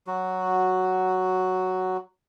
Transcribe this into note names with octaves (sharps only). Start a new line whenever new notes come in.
F#3 F#4